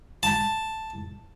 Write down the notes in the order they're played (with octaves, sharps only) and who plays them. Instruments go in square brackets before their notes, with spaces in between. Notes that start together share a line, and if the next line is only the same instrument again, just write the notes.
[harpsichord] A5